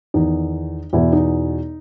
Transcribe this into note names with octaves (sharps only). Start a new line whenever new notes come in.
E2 D#3 D#4
E2 B2 E4
D#4